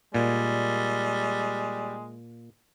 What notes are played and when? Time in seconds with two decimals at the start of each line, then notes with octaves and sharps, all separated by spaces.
0.14 A#2 G3 G#3